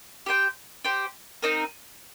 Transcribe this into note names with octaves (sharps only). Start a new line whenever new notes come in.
G4 C5 G5
G4 C5 G5
C4 D#4 A#4